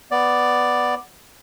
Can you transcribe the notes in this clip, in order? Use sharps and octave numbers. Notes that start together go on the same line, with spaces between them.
B3 D5